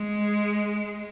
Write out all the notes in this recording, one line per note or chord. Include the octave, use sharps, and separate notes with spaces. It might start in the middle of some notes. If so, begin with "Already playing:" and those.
Already playing: G#3